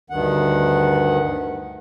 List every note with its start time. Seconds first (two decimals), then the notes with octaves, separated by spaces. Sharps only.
0.10 D2 G2 D#3 F#5